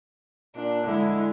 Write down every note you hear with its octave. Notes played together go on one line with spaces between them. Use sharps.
A#2 D4
D3 G#3 E4